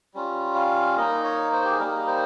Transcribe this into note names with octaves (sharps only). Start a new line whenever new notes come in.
G3 C#4 F4
F5
A#3 D#4 D#5
C#5
C5
G4
G#4
G3 A#3 D#4 A#4
C5